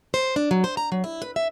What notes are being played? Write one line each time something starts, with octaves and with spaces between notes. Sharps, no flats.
C5
D4
F#3
C5
A#5
F#3
E4
B4
E5